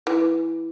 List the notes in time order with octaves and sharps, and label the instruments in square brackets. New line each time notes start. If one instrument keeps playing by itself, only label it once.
[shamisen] E3